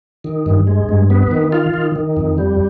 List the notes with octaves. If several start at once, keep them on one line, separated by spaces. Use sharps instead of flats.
D#3
G2
G#3
G2
B3
D#3
F4
D#3
D#3
F2
G3